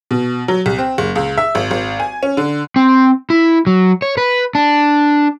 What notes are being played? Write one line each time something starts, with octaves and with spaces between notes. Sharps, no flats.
B2
F#3
C2
C4
F#1
C#2
E5
G#1
G#1
G#5
C#4
D3
C4
E4
F#3
C#5
B4
D4